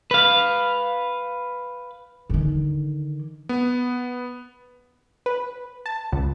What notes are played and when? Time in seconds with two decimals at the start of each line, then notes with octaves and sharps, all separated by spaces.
0.11 B4 F5
2.30 D3 D#3
3.49 B3
5.26 B4
5.86 A5
6.12 C#2